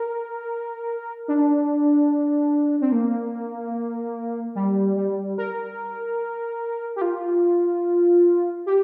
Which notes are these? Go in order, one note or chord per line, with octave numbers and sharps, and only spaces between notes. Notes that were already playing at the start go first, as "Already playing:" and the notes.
Already playing: A#4
D4
C4
A#3
G3
G3
A#4
G4
F4
G4